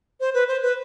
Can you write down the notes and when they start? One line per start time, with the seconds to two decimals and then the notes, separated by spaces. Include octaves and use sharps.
0.20 C5
0.34 B4
0.48 C5
0.62 B4